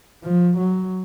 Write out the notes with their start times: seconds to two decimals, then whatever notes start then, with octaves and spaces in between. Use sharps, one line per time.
0.24 F3
0.57 F#3